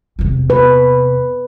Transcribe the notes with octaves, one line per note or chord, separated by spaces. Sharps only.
E2 C3
B4